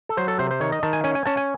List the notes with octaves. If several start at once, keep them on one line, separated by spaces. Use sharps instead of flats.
A4
F#3 C5
A4
C3 C5
C5
D#3 C#5
D#5
D#3 A5
G#5
C#4 G#5
G#5
C#4 A5
G#5